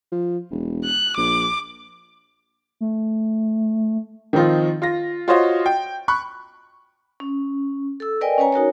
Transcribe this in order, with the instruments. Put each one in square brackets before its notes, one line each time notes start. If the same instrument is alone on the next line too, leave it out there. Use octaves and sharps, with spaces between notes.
[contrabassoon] F3
E1
[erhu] F#6
[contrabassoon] A#1 [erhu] D6
[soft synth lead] A3
[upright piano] D#3 F3 C4 D#4 F4
F4 A#6
F4 F#4 C5 C#5 D#5 F5
G5
B5 C#6 F#6
[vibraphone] C#4
A4 E6
A#4 B4 D5 D#5 G5 G#5
C#4 B4 C#5 G#5 A#5
D#4 F#4 A#4 C#5